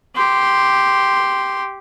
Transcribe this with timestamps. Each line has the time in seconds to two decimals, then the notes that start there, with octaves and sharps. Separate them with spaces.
0.16 G4 C6